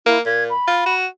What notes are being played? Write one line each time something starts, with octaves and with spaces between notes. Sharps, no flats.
A#3 E4
A#2 G#6
B5
F4
F#4